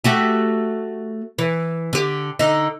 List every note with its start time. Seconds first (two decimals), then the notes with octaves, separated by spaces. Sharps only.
0.04 A3 F#4 G4
1.39 E3
1.93 D3 G4
2.39 D3 D#4